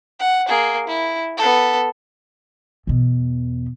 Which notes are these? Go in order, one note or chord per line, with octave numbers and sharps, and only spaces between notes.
F#5
A#3 G#4
E4
B3 A4
E2 B2